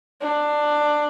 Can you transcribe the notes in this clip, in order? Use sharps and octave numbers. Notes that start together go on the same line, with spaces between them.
D4